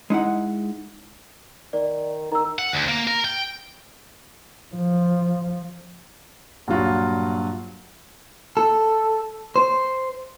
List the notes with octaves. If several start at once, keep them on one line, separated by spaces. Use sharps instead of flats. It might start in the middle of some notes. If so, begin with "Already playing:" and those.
G#3 D#4 E4 F#5
D#3 D5
D#3 A#5 E6
F#5
D2
A#3
A#4
G5
F3
G2 A#2 F#3 F4 F#4
A4
C5